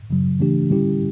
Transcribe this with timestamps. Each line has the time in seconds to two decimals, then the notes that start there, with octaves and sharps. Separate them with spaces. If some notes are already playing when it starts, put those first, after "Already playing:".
0.10 F#2 C#3 F#3
0.40 C#3 E3 A3 D4 G4
0.70 D3 G3 C#4 E4 G4